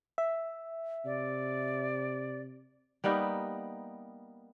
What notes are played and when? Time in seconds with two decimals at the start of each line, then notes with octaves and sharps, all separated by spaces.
0.18 E5
1.05 C3 D5
3.04 G3 A#3 B3 D#4